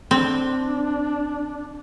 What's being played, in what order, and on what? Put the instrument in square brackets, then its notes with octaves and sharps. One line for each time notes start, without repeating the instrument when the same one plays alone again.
[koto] C4 [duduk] D4